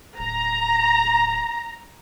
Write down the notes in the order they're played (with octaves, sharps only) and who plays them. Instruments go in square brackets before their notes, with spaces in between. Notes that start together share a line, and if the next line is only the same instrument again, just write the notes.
[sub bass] D1 [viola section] A#5